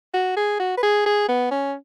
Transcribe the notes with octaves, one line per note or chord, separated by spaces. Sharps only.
F#4
G#4
F#4
B4
G#4
G#4
B3
C#4